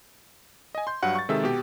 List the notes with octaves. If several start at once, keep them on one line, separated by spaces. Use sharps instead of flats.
D#5 G#5
C6 G6
G2 F#3 F#5
C#6 A6
C3 D#3 G#3 A4 E5 E6
B2 G4